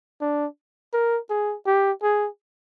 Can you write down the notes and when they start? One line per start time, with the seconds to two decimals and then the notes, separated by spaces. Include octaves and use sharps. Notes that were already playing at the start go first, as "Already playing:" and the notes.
0.21 D4
0.93 A#4
1.30 G#4
1.66 G4
2.03 G#4